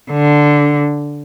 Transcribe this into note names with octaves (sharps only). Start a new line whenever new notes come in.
D3